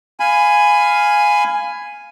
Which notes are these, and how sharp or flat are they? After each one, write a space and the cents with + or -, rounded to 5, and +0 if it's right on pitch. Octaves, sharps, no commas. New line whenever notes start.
F5 +0 G#5 +0 B5 +20